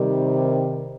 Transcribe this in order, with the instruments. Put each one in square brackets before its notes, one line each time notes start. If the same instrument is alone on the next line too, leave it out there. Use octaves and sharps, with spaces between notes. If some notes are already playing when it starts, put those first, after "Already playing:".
Already playing: [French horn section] C3 D#3 G3